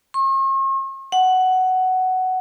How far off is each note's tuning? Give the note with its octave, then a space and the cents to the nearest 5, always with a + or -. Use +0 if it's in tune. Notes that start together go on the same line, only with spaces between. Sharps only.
C#6 -45
F#5 +10